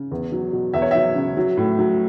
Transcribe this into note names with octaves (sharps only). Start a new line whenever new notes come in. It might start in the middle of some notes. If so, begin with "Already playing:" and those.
Already playing: C#3
E2
F#3
B2
E2 E5
C#5
F#3 E5
C#3
F#3
A2
F#3